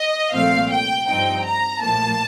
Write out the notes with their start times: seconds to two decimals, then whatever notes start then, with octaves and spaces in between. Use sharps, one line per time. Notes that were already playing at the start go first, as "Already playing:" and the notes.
Already playing: D#5
0.33 C2 A#2 F3 A3 C4 F5
0.71 G5
1.07 G2 F3 C4 D#4 G5
1.44 A#5
1.81 A#1 A2 F3 A#3 A5